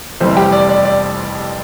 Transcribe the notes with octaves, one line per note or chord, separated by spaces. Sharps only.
F1 F2 E3 G3 C5
G4
D5
D5
D5